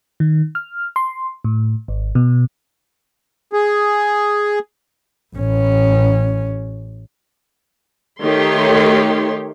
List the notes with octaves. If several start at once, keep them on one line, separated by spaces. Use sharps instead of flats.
D#3
F6
C6
A2
G#1
B2
G#4
A1 C#4
D#3 A3 G4 C#5 C6